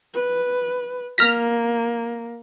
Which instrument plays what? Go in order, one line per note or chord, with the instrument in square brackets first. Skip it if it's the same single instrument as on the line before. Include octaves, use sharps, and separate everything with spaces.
[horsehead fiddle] B4
[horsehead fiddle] A#3 [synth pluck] F6 A#6 B6